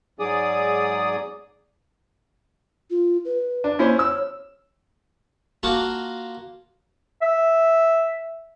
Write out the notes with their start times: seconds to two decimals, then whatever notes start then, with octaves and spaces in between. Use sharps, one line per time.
0.19 G#2 F#3 G#4 D5 D#6
2.90 F4
3.25 B4
3.64 D4
3.79 A#3 C#4 E4 C5
3.99 C#5 E6
5.63 A#3 F4 F#4 A5
7.22 E5